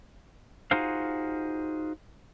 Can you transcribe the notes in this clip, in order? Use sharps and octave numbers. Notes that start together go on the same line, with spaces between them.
D#4 F4 F#4 G#4 C5 F5